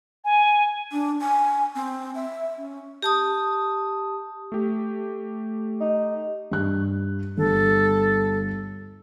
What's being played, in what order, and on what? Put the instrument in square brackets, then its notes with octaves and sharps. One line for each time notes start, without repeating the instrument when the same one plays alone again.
[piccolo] G#5
[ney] D4
G#5
C4
E5
C#4
[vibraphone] G4 A5 D#6
[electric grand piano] A3 G4
[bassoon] D#4
[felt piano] G2 F#6
[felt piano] G1 [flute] A4